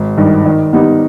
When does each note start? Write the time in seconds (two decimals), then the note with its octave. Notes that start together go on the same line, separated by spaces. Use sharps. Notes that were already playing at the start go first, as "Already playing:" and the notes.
Already playing: G#1
0.18 G2 D#3
0.45 D#3
0.73 G3 B3 D#4